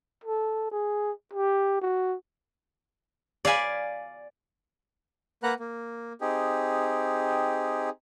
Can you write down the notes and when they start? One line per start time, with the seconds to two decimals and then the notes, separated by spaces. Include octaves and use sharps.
0.24 A4
0.72 G#4
1.33 G4
1.82 F#4
3.45 D5 F5 G#5 B5
5.43 A#3 B4 F#5 A#5 F#6
5.60 A#3
6.21 C4 D#4 G4 G#4